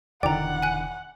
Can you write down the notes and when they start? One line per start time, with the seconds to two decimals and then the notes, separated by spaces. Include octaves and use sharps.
0.23 E1 D3 D#3 D5 F#5 G5 A#5
0.62 G#5 F#6